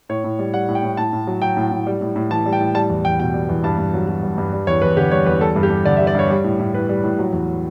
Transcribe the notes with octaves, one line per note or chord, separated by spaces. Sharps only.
A2 C#5
A2
G3
G3 F#5
A2
G5
A2
A2 A5
A2
F#3
F#3 G5
A2
A2
G3
A2
A2
E3 A5
G3
G5
A2
G3 A5
E2
E2 G5
B2 G5
G3
E2
G2 A5
G2
F#3
F#3
G2
G2
G3
E2 C#5
E2 B4
D3 G4
G3 C#5
E2 B4
G3 A4
G2
G4
G2
D3 D5
E5
G3
D5
G2 C#5
G3
A2
A2
E3 B4
G3
A2
F#3
E2